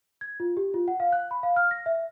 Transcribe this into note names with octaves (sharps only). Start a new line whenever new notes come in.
G#6
F4
G4
F4
F#5
F5
F#6
B5
F5
F6
A#6
E5